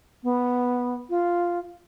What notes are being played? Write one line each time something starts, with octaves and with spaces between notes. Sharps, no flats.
B3
F4